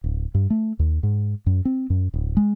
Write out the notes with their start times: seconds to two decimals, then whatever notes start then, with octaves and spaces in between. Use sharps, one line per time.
0.04 D1
0.35 G2
0.50 A3
0.79 D#2
1.03 G#2
1.46 F#2
1.65 C4
1.90 F#2
2.14 D1
2.37 G#3